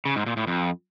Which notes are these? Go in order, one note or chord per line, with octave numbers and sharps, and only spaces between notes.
C#3
G#2
A#2
A2
F2